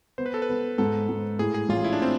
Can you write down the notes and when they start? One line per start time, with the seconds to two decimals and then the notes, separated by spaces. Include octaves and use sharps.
0.18 B3 C5
0.26 B4
0.34 A4
0.42 B4
0.49 B3
0.78 G#2 A4
1.09 G#2
1.39 A2 G#4
1.54 G#4
1.69 A1 F4
1.84 E4
1.93 D4
2.02 C4